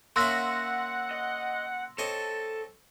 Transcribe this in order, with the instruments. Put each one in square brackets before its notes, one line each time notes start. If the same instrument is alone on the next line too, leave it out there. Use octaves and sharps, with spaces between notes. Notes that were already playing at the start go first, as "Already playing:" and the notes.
[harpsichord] A#3 C#4 E5 [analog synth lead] F#5 [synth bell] C6 E6 A#6
[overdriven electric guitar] D#5
[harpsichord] C4 C#5 D#5 [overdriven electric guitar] A4